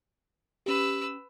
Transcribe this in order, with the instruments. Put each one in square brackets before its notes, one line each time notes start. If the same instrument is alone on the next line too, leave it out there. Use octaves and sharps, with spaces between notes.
[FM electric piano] C#4 G4 [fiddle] B4 E6